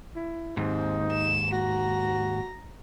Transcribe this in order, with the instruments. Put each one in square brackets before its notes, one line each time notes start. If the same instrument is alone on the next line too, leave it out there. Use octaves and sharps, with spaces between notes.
[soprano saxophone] E4
[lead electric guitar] D#2 G#2 [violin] C4 [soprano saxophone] D#4
[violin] E7
[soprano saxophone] F#4 [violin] A#5 A#6